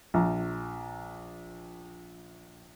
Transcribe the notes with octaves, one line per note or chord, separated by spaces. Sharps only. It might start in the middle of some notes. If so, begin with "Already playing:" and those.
A#1 A#5